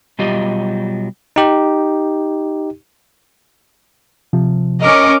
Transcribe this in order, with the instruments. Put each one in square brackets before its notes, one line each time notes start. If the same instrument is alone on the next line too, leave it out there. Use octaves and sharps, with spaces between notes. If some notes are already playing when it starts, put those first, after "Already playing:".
[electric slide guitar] B2 F#3 G3 F4 G4 D#5
[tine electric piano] D#4 G4
[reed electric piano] C3 F3
[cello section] C#4 A#4 [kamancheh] D#5 D6